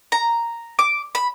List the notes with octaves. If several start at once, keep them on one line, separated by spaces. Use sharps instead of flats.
A#5
D6
B5